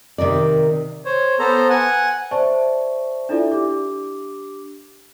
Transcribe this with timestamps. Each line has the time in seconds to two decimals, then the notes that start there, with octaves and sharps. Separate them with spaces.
0.18 C3 D#3 A#4 D5
1.05 C5 C#5
1.39 B3 A4 C5 A#5
1.70 F#5 G#5
2.31 C5 D5 E5 A5 C#6
3.29 D4 E4 F4 A4 D5 E5
3.51 D4 G4 D6